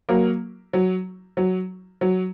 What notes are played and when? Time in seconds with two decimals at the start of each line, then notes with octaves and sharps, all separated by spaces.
0.09 F#3 A#3
0.73 F#3
1.37 F#3
2.01 F#3